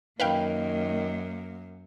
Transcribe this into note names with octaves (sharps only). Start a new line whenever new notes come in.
F#2 D#3 A#3 B4 F5 G5